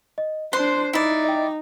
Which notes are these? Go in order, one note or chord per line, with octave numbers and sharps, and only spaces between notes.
D#5
D4 C5 C6 F#6 C7
D#4 E4 D5
D#5 G5